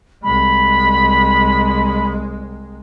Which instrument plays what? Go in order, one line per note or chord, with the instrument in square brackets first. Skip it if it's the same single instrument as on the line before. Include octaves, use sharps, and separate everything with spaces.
[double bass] C2 G#3 [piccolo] B5